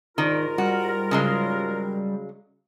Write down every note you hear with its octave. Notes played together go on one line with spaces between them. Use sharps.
G#2 D#3 F4 A#4 D5
G3 F#4
C#3 F#3 G#3